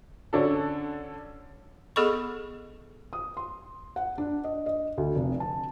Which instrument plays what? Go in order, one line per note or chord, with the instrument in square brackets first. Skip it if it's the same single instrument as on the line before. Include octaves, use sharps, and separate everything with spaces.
[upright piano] D3 C#4 D4 A4
[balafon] B3 G#4 A4 D#5 B5 C#6
[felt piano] D#6
C6
F#5
D4
D#5
D#5
D2
F1
A5